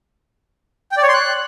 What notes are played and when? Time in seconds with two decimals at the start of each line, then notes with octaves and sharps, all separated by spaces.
0.92 G5
0.97 D5
1.03 C#5
1.08 C6
1.14 F#6